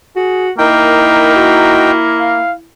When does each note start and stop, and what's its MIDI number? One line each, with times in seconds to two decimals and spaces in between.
0.16 0.51 66
0.16 0.46 68
0.58 2.41 58
0.58 1.91 63
0.58 2.68 64
0.58 1.32 70
0.58 1.91 79
1.35 1.99 66
2.20 2.53 77